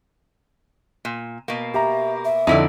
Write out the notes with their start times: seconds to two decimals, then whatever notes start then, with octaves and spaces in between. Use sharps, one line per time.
1.05 A#2
1.48 B2 A#3
1.74 G4 E5 A#5
2.25 E5
2.47 F2 D3 D#4 E4 D5